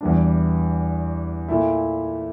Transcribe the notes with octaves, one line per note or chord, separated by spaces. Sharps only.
E2 E3 G3 D4
A#2 A3 E4